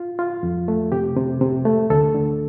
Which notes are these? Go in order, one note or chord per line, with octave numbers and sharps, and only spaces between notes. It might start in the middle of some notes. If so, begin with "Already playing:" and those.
Already playing: F4
F4
F2
A3
C3 G4
C3
C3
A3
D2 A4
D3